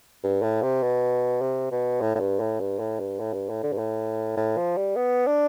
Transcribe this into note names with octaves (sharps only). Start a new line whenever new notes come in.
G2
A2
C3
B2
C3
B2
A2
A2
G2
A2
G2
A2
G2
A2
G2
A2
D3
G2
A2
A2
F3
G3
B3
D4